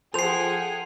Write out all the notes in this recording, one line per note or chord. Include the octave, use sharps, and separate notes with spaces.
F3 G#4 A4 C5 F#5 G5 C7 F7